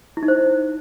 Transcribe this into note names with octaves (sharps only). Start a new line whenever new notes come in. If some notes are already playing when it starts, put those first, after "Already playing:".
E4
D#4
C5